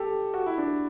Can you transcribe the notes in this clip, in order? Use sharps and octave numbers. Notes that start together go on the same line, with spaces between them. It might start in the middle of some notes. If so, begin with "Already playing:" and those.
Already playing: G4 A4
F#4
E4
D4